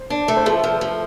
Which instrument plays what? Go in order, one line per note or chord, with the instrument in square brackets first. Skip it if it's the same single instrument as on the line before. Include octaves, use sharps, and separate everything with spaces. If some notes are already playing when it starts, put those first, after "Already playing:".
Already playing: [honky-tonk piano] C5
[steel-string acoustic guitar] D4
A3
[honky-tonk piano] C5
[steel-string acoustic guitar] F3 [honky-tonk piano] A4 B4
[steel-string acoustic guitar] F3
F3